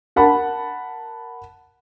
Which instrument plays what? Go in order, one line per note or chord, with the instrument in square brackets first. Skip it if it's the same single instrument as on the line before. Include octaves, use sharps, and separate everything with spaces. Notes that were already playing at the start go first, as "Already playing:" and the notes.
[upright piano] A#4 F#5 A5 B5